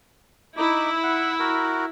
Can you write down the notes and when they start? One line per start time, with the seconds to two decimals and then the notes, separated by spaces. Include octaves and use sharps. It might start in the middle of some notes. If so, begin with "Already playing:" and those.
0.57 D#4 E4 D6
1.04 F#5
1.40 F#4 A#4